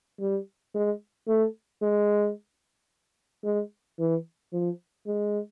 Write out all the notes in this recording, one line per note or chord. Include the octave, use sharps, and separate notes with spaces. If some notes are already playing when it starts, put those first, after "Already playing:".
G3
G#3
A3
G#3
G#3
E3
F3
G#3